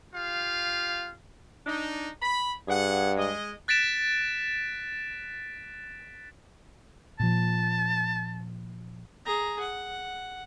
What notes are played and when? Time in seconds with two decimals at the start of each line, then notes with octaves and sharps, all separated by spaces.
0.14 F4 G4 F5
1.65 D4 D#4
2.22 B5
2.68 G2 G#4 F#5
3.17 G#3 G#4 D#5
3.68 F#6 A6 B6 D7 E7
7.20 A#2 F3 A5
9.25 G#4 A#5
9.60 F#5